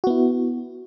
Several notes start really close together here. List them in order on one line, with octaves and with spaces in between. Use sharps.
F#4 B3 E4